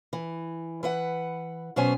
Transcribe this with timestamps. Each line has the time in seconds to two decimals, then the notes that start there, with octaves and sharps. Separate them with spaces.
0.13 E3
0.83 E3 B4 F#5
1.76 B2 F#3 B3 C#4 C5 G#5